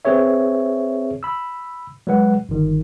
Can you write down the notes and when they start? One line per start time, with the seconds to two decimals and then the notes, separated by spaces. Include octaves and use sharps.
0.05 C4 G#4 B4 C#5 E5
1.23 B5 E6
2.07 F#3 G#3 B4 F#5
2.49 G1 D#3